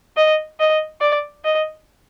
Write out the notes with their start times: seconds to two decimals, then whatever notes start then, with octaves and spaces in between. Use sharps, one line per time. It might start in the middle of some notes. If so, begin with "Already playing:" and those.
0.17 D#5
0.60 D#5
1.01 D5
1.45 D#5